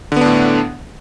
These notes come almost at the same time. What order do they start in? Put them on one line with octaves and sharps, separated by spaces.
D3 B3 D4 A2